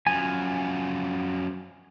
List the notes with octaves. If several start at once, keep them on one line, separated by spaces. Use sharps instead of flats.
F#2 F3 G#5